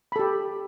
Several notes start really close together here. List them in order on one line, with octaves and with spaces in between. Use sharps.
B5 A4 G4